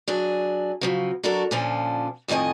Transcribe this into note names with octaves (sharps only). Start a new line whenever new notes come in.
F#3 D4 G#4
C#3 F3 F#3
F#3 D4 F#4 A4 A#4
A#2 D3 F3 C#4 D4
F2 A2 D#3 D#5 G#5